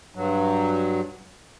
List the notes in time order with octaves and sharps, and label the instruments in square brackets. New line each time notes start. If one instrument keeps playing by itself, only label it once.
[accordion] G2 F#3